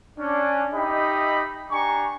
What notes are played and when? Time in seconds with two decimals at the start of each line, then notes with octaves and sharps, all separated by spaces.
0.19 C#4 D4
0.74 D#4 G4 D#5 E5 B5
1.72 D4 G4 G#5 A#5 C#6